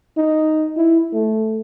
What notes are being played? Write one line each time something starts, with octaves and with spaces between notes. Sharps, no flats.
D#4
E4
A3